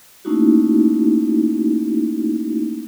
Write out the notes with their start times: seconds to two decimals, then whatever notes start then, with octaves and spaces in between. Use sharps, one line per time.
0.25 A3 A#3 C#4 D#4 E4 F#4